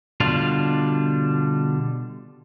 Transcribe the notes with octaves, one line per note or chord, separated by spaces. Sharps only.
B2 D3 G3 D4 F4